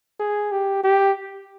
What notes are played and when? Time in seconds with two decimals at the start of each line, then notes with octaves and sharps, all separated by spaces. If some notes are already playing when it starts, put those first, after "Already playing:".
0.20 G#4
0.51 G4
0.83 G4